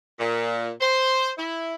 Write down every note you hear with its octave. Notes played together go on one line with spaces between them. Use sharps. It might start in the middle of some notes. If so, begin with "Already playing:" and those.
A#2
C5
E4